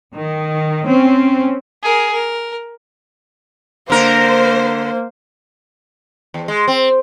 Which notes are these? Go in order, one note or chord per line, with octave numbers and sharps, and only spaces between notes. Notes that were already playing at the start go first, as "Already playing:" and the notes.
D#3
C4 C#4
G#4 A#4
A#4
D3 A#3 A#4 C5
E2
G#3
C4